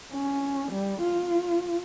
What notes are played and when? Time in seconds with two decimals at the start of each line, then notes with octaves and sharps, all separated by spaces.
0.12 C#4
0.72 G3
1.01 F4